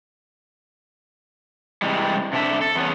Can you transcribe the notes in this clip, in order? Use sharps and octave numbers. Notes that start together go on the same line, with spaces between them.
C3 E3 G3 G#3
C3 D4 E5
A4
E2 B3 C#4